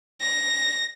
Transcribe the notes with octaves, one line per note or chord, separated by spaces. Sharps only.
A#6